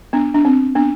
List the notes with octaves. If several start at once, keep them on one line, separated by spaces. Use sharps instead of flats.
B3 D4
D4
C4
B3 D4